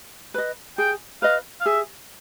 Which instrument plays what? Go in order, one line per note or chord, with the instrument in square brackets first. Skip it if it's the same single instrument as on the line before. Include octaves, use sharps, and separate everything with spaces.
[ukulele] B4 D#5
[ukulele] G#4 [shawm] G5
[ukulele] B4 D#5 [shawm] F5
[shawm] F5
[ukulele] G#4 [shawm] E5